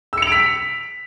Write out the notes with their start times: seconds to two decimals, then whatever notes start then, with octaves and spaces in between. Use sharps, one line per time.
0.13 E6
0.18 C#7
0.22 F7
0.27 D7
0.32 B6